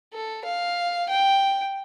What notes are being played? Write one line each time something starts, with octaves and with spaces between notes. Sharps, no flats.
A4
F5
G5